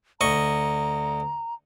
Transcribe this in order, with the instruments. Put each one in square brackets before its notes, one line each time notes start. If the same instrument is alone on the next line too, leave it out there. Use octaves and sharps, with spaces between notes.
[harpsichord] D2 D#5 C#6 [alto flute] A#5